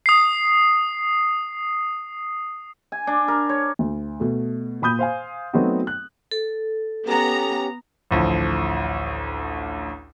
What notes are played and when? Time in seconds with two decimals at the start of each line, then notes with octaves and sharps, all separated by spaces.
0.06 D#6 C7
2.92 G#5
3.07 D4
3.28 A#4
3.49 C#5
3.79 D2
4.20 B2 A3
4.82 A#2 B5 D#6 G6
4.99 C5 F5 G#5
5.53 F#3 A3 B3 C4 D#4 F#4
5.87 F#6
6.31 A4
7.07 B3 C#4 G4 A#5
8.11 A1 D2 F3